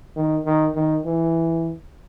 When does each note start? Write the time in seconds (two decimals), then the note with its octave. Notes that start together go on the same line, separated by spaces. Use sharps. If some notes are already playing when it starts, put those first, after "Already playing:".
0.16 D#3
0.45 D#3
0.75 D#3
1.05 E3